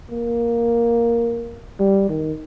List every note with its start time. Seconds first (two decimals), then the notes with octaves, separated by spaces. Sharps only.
0.11 A#3
1.80 G3
2.09 D#3